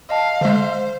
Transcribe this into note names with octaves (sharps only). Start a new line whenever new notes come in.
D#5 F5 A5
D3 G#3 C5